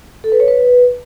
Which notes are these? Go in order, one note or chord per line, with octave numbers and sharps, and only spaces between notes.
A4
B4
C#5
B4